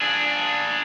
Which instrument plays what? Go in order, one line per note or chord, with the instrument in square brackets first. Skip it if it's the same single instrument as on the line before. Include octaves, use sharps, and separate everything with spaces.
[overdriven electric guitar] D4 G#4